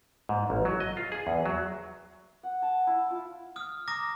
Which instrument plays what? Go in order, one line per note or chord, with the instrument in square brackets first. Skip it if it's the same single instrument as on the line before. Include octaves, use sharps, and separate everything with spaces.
[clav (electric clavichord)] G#2
A1
F#3
D#5
F4
G#4
E2
F#3
[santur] F#5
A5
E4
F4
[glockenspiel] D#6 F6
A#5 D6 D#6 A#6